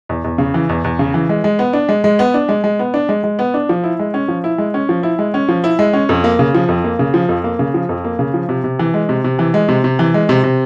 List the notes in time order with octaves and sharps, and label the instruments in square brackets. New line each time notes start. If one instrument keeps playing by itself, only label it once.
[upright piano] E2
E2
C#3
E3
E2
E2
C#3
E3
G#3
G#3
B3
D4
G#3
G#3
B3
D4
G#3
G#3
B3
D4
G#3
G#3
B3
D4
F3
E4
G#3
C#4
F3
E4
G#3
C#4
F3
E4
G#3
C#4
F3
E4
G#3
C#4
F2
A#3
C#3
F3
F2
A#3
C#3
F3
F2
A#3
C#3
F3
F2
A#3
C#3
F3
C3
C3
E3
G#3
C3
C3
E3
G#3
C3
C3
E3
G#3
C3
C3